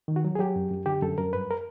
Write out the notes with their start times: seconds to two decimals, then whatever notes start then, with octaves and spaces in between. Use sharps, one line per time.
0.08 D#3
0.16 F#4
0.25 F#3
0.35 G#4
0.39 F#3 G4
0.56 F#2
0.71 F#2
0.86 D3 G4
1.02 F#2 A4
1.18 F#2 A#4
1.33 G2 B4
1.50 A#4